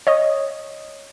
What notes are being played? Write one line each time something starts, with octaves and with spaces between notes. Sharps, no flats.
C#5 D#5 D#6